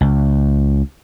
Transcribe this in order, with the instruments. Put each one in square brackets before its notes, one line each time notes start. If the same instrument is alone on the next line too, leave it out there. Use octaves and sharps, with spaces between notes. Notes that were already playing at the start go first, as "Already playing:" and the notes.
[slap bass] C#2